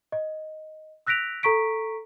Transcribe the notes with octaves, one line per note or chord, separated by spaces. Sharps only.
D#5
E6 F#6 A#6 B6 D7 F7
A4 A#5 C#6 B6 D7